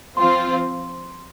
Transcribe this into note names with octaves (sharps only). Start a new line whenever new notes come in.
F3 C4 F4 C5 C6